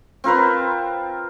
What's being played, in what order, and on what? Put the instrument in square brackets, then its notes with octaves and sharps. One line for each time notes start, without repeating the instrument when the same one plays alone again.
[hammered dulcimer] C4 F4 A#4 B4